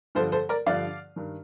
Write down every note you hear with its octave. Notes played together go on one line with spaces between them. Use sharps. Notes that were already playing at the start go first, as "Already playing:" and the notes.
G2 D3 F3 A4 C5
A4 C5
A#4 D5
G2 D3 F3 D5 F5
G2 D#3